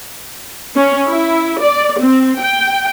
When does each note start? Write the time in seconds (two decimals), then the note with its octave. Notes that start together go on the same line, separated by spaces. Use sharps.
0.76 C#4
1.08 E4
1.61 D5
2.01 C4
2.39 G5